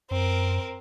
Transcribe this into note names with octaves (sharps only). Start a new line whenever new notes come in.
F#2 C4 A#4